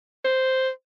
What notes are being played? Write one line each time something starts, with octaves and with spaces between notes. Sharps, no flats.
C5